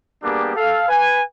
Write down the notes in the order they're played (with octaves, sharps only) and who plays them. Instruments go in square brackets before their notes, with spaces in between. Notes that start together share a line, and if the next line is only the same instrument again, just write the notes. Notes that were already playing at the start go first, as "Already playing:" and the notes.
[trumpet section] G3 A#3 B3 D4 G4 G#4
A4 F5
B4 G#5